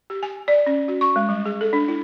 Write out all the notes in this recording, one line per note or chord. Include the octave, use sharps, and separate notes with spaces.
G4
G#5
D5
C#4
F#4
C#6
G#3
G3
G#4
A4
D4
E4